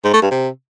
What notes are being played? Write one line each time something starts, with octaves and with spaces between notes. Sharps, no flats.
G#2
A3
G2
C3